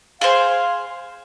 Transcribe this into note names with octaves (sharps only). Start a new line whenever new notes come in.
G#4 C5 F5